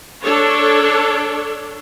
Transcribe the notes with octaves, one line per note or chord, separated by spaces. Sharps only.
D4 A4 C#5